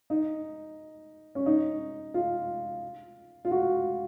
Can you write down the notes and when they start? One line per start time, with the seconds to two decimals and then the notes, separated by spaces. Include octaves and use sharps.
0.10 D#4
1.35 C#4
1.46 D#4
2.14 F4
3.45 F4
3.51 F#4